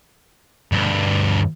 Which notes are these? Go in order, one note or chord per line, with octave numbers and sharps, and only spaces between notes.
D2 G2